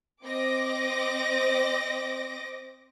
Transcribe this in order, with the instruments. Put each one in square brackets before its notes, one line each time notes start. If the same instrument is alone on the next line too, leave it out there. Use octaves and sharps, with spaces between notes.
[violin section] C4 D#5 D6 A#6